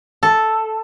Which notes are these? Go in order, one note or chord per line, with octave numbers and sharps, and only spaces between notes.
A4